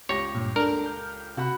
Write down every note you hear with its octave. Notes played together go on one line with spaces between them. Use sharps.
C#2 G4 C#5 A#6
G2 A#2
D4 A4 A#4
F6 G6
C3 F#4 F#5 B5